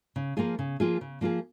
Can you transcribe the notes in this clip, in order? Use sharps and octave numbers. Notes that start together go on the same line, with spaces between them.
C#3
F3 A#3 F4 G#4
C#3
F3 A#3 F4 G#4
C#3
F3 A#3 F4 G#4